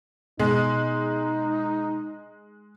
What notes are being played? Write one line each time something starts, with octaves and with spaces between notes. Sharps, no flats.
B2 G#3 D#4